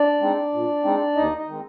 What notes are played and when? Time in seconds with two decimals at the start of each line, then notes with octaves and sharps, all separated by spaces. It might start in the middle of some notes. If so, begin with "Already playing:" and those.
Already playing: D4 D5
0.21 G#3 C4 D#4
0.53 A#2
0.84 G#3 C4 D#4
1.16 D#2 D#4 D#5
1.37 D#4 D#5
1.47 D#3 G#3 C4